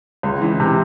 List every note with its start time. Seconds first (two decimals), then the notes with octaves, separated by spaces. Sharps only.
0.23 C#2
0.41 E3
0.60 C3